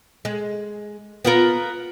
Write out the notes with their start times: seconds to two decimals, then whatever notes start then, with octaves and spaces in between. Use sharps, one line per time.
0.25 G#3
1.25 B3 F4 A#4